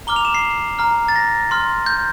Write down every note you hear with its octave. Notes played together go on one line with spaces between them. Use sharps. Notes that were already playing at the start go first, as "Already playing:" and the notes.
A#5 D6 F6 G7
F7
E7
C7
A#5 F6
A6
A#6
C6 F6
G6